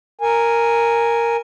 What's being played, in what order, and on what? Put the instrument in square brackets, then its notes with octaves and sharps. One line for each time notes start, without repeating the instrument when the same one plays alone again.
[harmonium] A#4 G#5